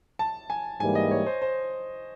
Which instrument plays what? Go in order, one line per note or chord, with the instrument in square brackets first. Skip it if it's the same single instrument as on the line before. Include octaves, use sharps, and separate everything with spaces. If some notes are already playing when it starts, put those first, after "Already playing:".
[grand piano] A5
G#5
[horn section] G#2 E3 G3 A#3 [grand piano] G#5
[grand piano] D#5
C#5
C5
C5